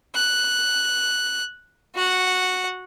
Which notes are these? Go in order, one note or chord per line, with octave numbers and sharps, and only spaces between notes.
F#6
F#4 F#5